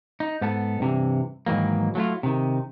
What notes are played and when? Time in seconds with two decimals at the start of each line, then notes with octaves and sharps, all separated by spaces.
0.20 D#4
0.41 G#2 B3 A4
0.80 G2 C3 E3
1.46 G#2 D#3 E3 F#3 A#3
1.95 F#3 A3 E4 F4
2.23 C3 D#3